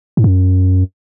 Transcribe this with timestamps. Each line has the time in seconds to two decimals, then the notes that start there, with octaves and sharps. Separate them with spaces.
0.17 G#2
0.24 F#2